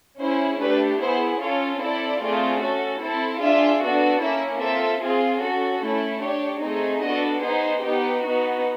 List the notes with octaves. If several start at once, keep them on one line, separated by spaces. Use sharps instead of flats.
C#4 E4 G#4 C5
A3 D4 G4 B4
B3 E4 G#4 C5
C#4 F4 A4 C#5
C4 E4 A4 D5
A3 C4 F4 G#4
C#4 F#4 A4
C4 E4 A4
D4 F4 G#4 E5
B3 D4 F#4 A4
A#3 C#4 E4 E5
C4 F4 A4 E5
C4 F4 G#4
C#4 F#4 A4
A3 C#4 E4
D4 G4 C#5
A3 C4 D#4 G#4
B3 D4 F#4 A4 D#5
B3 D#4 G#4 C5
B3 D#4 G4
B3 D#4 F#4